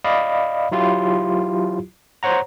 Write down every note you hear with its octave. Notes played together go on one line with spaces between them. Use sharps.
D5 D#5 F5 B5
F#3 E4 F4 G4
C5 C#5 F#5 A#5